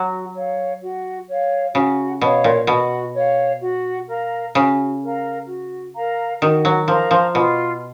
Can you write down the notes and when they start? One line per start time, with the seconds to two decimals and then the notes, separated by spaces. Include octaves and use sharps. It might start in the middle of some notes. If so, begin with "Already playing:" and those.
Already playing: F#3 F#4
0.34 C#5 F5
0.81 F#4
1.28 C#5 F5
1.74 C#3 F#4
2.21 B2 C#5 F5
2.44 A#2
2.67 B2 F#4
3.14 C#5 F5
3.61 F#4
4.08 A#4 F5 A#5
4.55 C#3 F#4
5.02 A#4 F5 A#5
5.48 F#4
5.95 A#4 F5 A#5
6.42 D#3 F#4
6.65 F#3
6.88 F3 A#4 F5 A#5
7.11 F3
7.34 B2 F4